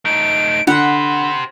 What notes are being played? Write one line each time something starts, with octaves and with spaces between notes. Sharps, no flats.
A3 D#4 D7
D3 G4 C5 F#5 B5